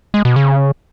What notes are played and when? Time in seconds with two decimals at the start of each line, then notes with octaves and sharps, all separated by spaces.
0.14 G#3
0.25 B2
0.36 C#3